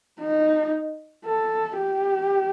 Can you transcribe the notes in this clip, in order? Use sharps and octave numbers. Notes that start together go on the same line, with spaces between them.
D#4
A4
G4